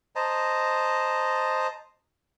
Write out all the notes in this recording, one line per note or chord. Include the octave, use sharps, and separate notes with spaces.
C5 D#5 A5 A#5